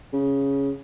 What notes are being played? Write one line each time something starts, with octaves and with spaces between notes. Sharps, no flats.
C#3